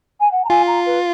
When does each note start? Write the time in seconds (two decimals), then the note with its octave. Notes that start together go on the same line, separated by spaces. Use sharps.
0.20 G#5
0.31 F#5
0.45 A#5
0.49 F4 G#5
0.67 A#5
0.86 B4